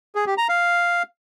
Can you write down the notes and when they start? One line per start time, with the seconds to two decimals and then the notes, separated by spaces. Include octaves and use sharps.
0.15 G#4
0.27 G4
0.38 A#5
0.49 F5